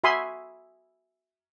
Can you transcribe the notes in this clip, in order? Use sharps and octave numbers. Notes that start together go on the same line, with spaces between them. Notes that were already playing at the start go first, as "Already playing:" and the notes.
F#4 E5 G#5 B5 C6 D#6